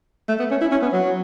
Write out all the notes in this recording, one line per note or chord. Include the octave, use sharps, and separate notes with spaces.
A3
B3
C#4
E4
C#4
B3
F#3